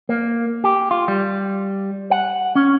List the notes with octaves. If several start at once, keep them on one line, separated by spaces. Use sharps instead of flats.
A#3
G4
F4
G3
F#5
C#4